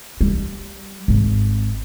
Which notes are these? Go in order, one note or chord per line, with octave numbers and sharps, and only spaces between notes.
G3
G#1